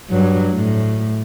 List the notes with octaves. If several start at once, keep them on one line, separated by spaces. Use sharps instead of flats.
G2 F#3
A2